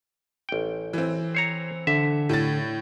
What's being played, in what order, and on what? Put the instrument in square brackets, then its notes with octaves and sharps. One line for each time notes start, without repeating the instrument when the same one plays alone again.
[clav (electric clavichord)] A1 G5
[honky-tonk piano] E3 C4
[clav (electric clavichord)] C5 C#5 A#5
[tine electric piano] D3 [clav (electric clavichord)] E5
[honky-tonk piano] A2 A6